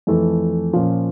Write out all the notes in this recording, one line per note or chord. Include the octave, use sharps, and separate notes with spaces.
F2 E3 A3
A#2 F3 C#4